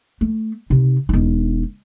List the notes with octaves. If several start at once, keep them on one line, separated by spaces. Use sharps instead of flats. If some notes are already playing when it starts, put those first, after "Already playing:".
A3
C3 D#4
E1 D#4